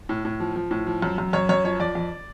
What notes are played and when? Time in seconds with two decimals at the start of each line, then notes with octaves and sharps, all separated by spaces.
0.09 A2
0.25 A2
0.40 F3
0.56 F3
0.71 A2
0.87 F3
1.02 F#2
1.18 F#2
1.33 F#2 C#5
1.49 F#2 C#5
1.64 F3 C#5
1.80 F2 D5
1.95 F2